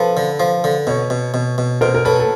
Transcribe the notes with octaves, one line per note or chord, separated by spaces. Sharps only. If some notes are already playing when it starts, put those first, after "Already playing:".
Already playing: F3 A4 B4
D3
F3
D3
B2 B4 C#5
B2
B2
B2
B2 A#4 C5
A#4
F#3 A4 B4
A4